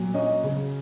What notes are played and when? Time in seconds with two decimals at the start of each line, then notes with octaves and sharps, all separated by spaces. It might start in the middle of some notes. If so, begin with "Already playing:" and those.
Already playing: A#2 F#3
0.14 C#4 D#5
0.44 C#3